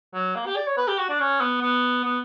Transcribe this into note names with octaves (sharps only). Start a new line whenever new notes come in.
F#3
A#3
G4
D5
C#5
B4
G4
F#4
D4
C#4
B3
B3
B3